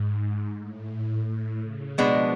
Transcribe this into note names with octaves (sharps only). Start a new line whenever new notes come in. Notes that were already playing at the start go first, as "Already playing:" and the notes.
Already playing: G#2
A2
A2
C#3
B2 F3 G#3 B3 D4